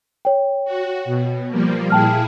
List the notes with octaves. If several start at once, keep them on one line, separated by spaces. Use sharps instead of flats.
C#5 G5
F#4
B2
F3 G3 A#3
A#2 E4 G#4 G5 A5 F6